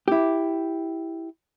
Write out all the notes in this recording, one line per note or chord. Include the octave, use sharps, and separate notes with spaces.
E4 G4